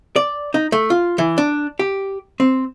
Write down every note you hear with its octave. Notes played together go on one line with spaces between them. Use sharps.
D5
D#4
A3
F4
E3
D4
G4
C4